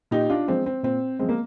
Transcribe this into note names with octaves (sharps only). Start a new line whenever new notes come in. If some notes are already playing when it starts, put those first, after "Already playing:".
A#2 D#4 G4
D4 F4
F3 G#3 C4
C4
A#2 C4
F3 G#3 C4
A#3